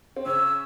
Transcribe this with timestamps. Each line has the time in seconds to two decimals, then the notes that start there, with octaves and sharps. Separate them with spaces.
0.16 C4
0.26 C#3 C#4 E6